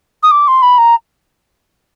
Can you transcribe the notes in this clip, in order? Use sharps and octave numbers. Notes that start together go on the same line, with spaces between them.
D#6
D6
C6
B5
A#5